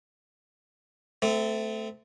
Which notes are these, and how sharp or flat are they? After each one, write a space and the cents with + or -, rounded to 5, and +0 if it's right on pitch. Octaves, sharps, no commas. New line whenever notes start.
A3 +0 C4 -30